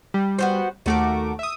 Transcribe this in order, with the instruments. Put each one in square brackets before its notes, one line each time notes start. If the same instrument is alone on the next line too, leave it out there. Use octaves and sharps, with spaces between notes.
[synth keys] G3
[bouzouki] B3 F#4 C5
[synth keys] D#2 A3 D6 [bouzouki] F#4 G4 A#4
[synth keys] E5 D#6